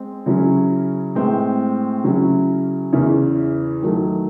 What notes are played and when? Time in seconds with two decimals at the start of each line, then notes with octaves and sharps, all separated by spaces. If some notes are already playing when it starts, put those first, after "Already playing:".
Already playing: G#3 C4
0.26 C#3 F#3 C#4 E4
1.15 A2 G#3 C4
2.04 C#3 F#3 C#4 E4
2.93 E2 C#3 E3
3.82 D#3 F#3 A3